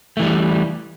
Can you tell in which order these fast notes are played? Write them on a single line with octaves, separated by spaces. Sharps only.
A3 E3 G3